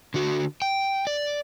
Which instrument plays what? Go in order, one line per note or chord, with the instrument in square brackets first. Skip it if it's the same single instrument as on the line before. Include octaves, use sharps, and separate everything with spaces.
[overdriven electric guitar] D3 F#4
G5
D5